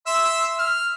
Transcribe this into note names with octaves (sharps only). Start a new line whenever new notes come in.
E5 C6 E6
F6